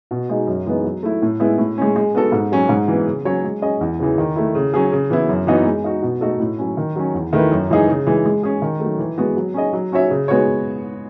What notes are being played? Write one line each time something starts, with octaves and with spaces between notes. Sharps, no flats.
B2
G#3 D#4
F#2
E3 G#3 B3 D#4
F#3
A3 E4
A2
G#3 B3 E4
A2
G#3 C#4
G#3
B3 F#4 A4
G#2
F#3 C#4
G#2
E3 B3
C#3
F#3 C#4 F#4 C#5
G#3
C#4 G#4 D#5
E2
C#3 E3
D#3
A3 E4
C#3
F#3 C#4 G#4
C#3
E3 B3 E4
F#2
E3 B3 D#4 F#4
G#3
D#4 F#4
B2
A3 D#4 F#4 A4
A2
F#3 C#4
D#3
F#3 C#4
E2
D#3 A3 E4 B4
F#2
E3 G#3 D#4 G#4
C#3
E3 G#3
G#3
C#4 G#4
D#3
F#3 A3
E3
G#3 B3 F#4
F#3
C#4 G#4 D#5
F#3
C#4 F#4 C#5 E5
C#3
G#3 B3 F#4 C#5